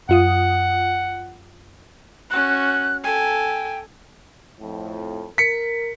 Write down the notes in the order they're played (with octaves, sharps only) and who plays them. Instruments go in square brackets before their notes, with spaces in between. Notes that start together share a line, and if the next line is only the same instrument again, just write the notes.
[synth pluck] F#2 F4 D#6 [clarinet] F#5
[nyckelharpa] C#4 F#4 [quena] F#6
[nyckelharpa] A4 G#5 [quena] G5
[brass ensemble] F2 A2
[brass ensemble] A#4 [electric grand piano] B6 C#7